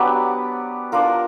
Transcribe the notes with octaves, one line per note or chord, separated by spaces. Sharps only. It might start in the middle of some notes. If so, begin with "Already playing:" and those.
Already playing: F#3 B3 D4 G4
D4 F4 A#4